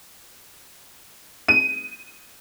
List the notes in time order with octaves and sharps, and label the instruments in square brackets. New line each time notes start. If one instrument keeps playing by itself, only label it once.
[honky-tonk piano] D#7